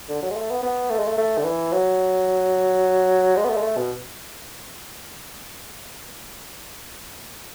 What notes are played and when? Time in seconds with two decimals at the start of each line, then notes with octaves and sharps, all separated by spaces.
0.09 D3
0.22 F#3
0.30 G#3
0.36 A3
0.50 B3
0.63 B3
0.91 A3
0.99 G#3
1.08 A3
1.18 A3
1.38 D3
1.44 E3
1.73 F#3
3.36 G#3
3.45 B3
3.50 A3
3.57 G#3
3.62 A3
3.77 B2